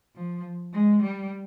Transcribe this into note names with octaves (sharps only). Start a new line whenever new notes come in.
F3
G#3
G3